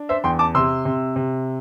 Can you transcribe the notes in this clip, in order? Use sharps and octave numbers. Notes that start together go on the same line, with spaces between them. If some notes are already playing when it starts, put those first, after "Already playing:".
Already playing: D4
C5 E5
E2 G5 C6
A5 D6
C3 C6 E6
C3
C3